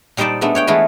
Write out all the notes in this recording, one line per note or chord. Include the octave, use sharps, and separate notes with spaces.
A#2 G3 D#4 C5 D5 A5
G#3 A3 B3 D4
C#5 F#5 G5
E3 G#3 A3 F4 B4